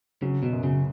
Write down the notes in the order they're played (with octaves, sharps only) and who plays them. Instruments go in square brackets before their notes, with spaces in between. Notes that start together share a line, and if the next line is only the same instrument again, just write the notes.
[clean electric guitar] C#3 [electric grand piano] F#3
[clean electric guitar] B2
[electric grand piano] F#2
[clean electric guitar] C#3